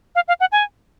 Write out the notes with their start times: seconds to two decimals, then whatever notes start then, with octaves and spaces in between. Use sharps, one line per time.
0.15 F5
0.28 F5
0.40 F#5
0.52 G#5